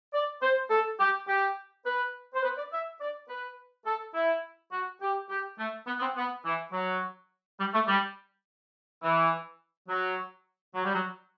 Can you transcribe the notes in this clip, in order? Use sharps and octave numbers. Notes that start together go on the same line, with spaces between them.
D5
C5
A4
G4
G4
B4
C5
B4
D5
E5
D5
B4
A4
E4
F#4
G4
G4
A3
B3
B3
C4
B3
E3
F#3
G3
A3
G3
E3
F#3
F#3
G3
F#3